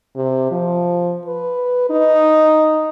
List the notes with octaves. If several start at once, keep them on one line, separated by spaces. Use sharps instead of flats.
C3
F3
B4
D#4